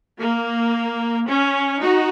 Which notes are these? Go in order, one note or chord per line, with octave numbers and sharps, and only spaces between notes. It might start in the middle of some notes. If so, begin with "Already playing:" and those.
A#3
C#4
D#4 F#4